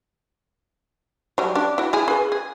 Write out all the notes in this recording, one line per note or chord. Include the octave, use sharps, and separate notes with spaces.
F#3 G3
D4 G4
E4 F#4
E4 G#4 G#5
G#4 B4
G#4